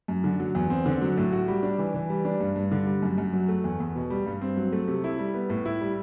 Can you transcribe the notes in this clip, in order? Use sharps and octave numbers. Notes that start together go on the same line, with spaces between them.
F#2
D3
F#3
E2
C4
D3
F#3
A2
F#4
G3
D4
E3
E3
G3
D4
G2
G2
D3
G3
F#2
F#2
F#3
A3
E2
E2
B2
G3
G2
C4
F#3
A3
C3
E4
G3
B3
A2
E4
G3